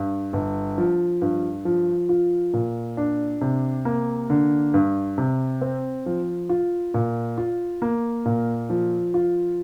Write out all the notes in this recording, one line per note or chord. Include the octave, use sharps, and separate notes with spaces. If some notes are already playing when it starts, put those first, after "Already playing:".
Already playing: G2
G1
F3
G2
F3
F4
A#2
D4
C3
A#3
D3
G2
C3
C4
F3
F4
A#2
F4
A#3
A#2
F3
F4